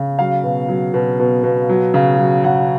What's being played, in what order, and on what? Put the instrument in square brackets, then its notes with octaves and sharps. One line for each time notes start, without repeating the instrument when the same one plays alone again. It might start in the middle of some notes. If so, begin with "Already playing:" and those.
Already playing: [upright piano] C#3
F#3 F5
B2
F#3
B2
B2
B2
F#3
C#3
F#3
C#3 F#5